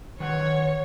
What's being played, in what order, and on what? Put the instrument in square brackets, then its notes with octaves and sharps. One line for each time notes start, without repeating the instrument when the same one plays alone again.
[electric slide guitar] D#3 B4 F#5 [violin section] C#5